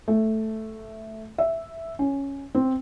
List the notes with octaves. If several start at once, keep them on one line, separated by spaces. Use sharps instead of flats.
A3
E5
C#4
C4